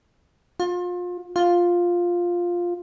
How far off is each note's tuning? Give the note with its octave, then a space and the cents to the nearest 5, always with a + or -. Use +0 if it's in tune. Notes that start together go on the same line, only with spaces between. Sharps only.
F4 +30
F4 +5